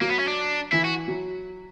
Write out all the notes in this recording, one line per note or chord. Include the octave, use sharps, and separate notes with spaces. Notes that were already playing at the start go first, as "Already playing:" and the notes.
F#3 A#3
B3
C#4
D4
E3 E4
F#4
F#3